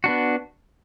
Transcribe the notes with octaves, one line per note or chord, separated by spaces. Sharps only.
B3 D4 F#4